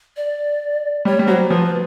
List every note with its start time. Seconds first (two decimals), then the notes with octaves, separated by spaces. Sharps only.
0.16 D5
1.05 G3 C#5
1.19 G3
1.27 F#3 C5
1.49 F3 B4